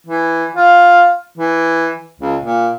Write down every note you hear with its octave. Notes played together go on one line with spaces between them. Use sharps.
E3
F4
E3
C#2
A#2